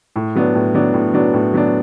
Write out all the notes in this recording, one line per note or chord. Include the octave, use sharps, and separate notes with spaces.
A2
F#3 B3 D4
A2
F#3 B3 D4
A2
F#3 B3 D4
A2
F#3 B3 D4